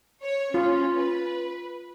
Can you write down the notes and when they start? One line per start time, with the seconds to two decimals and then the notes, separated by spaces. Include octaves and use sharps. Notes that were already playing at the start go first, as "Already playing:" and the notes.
0.23 C#5
0.54 C#4 F4
0.98 B4